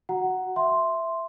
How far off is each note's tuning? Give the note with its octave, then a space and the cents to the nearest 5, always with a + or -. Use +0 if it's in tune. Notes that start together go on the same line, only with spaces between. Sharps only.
F#4 +0 F#5 +0 A#5 +0
E5 +0 C6 +0